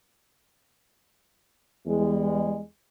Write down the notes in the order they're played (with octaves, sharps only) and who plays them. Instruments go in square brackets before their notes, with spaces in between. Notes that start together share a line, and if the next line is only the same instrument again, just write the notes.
[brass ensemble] E2 G3 G#3